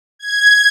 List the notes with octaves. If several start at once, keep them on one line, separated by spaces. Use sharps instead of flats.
G#6